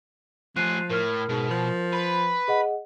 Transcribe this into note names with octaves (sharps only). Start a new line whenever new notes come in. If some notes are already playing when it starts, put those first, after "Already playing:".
F3 A3 G#5 F#6 C7 D#7
A2 A#4 F6
G#2 B2
F3
B4
G#4 D#5 F#5